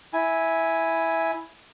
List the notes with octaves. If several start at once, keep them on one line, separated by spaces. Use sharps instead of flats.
E4 G#5